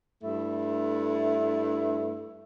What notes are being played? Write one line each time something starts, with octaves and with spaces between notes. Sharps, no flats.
G2 A3 E4